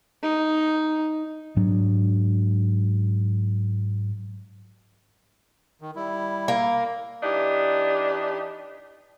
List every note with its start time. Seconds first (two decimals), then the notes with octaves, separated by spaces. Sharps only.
0.23 D#4
1.56 G#2 F#3 D4
5.81 D#3
5.96 G3 E4
6.48 A#3
7.23 E3 D4 D#4 G4